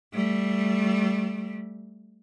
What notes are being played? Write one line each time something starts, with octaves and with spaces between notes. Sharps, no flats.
G3 A3